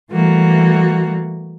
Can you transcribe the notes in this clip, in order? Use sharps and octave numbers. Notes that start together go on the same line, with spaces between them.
E3 G3 A3 A#3 F#4